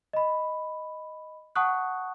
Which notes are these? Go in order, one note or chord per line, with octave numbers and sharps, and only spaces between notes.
D#5 B5
F#5 A5 C#6 D#6 F#6